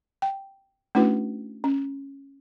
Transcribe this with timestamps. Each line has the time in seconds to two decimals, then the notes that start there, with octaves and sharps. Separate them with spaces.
0.22 G5
0.95 A3 C#4 D4 E4 F#4 B4
1.64 C#4